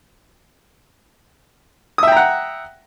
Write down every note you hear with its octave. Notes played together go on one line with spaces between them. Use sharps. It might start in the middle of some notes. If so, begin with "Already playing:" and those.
E5 F#5 G5 A#5 D#6